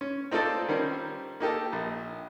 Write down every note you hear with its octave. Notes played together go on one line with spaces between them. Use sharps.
C#4
C4 D#4 F4 A4 D5
D#3 G3 C#4 A#4 C5
A#3 D#4 G4 A4
A#1